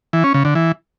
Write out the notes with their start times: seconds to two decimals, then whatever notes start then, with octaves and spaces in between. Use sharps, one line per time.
0.13 E3
0.24 C#4
0.34 C#3
0.45 D3
0.55 E3